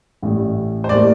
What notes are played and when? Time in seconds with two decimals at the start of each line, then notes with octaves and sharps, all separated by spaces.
0.22 A1 A2 G3
0.84 C5
0.89 A2 G3 A#3 D5